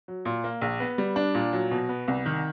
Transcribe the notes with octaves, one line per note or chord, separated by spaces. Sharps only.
F#3
A#2
A#3
A#1
B3
G3
D4
A#2
F#3
B2
B3
C2
D#3